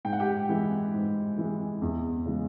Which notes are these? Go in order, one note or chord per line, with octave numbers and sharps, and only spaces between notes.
G#2 G5
F#5
G4 G5
E3 G#3
G#2
E3 G#3
E2
C#3 E3 G#3